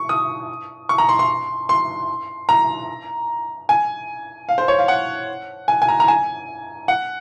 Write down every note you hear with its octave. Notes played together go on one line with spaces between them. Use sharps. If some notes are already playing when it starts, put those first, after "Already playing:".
Already playing: C#6
D#6
C#6
A#5
C6
C6
C6
A#5
G#5
F5
C5
C#5
F5
F#5
G#5
G#5
A#5
A#5
G#5
F#5